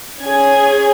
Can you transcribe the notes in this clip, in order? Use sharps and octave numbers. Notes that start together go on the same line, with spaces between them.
C#4 G#4 G#6